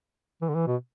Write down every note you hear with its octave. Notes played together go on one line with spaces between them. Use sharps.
E3
D3
E3
B2